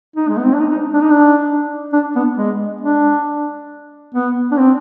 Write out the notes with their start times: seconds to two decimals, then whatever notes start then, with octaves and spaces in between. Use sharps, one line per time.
0.16 D#4
0.29 G#3
0.37 B3
0.45 C4
0.53 D4
0.60 D#4
0.71 D#4
0.94 D4
1.01 D#4
1.10 D4
1.93 D4
2.16 B3
2.37 G#3
2.81 D4
4.15 B3
4.52 D4
4.58 C4